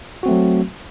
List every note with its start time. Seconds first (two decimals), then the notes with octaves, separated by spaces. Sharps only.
0.23 F#4
0.26 C4
0.28 A3
0.31 F#3